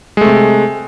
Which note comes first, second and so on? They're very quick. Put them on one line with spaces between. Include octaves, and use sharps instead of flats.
G#3 A3 C3